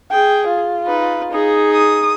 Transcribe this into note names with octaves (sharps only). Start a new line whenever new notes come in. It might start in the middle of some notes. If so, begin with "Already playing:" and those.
G#4 G5
F4
D#4 B4
D#4 G#4
D#6